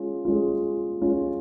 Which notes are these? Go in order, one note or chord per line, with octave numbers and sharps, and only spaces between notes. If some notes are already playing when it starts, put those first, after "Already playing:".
Already playing: G#3 C#4 F4
G#3 C#4 F4
G#3 C#4 F4